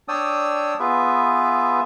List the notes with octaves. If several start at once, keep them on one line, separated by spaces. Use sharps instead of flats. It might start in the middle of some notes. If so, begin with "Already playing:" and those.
D4 C#5 D5 G5 D#6 E6
B3 F4 G#4 B4 E5